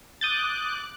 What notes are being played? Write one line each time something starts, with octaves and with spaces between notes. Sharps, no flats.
D6 D#6 F#6 G6 A6